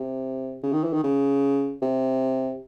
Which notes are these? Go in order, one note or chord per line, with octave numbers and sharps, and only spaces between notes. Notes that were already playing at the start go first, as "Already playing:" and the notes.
Already playing: C3
C#3
D#3
E3
D#3
C#3
C3